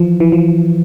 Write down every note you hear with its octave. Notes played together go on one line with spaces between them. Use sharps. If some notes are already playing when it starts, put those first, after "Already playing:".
Already playing: E3 F3
E3
F3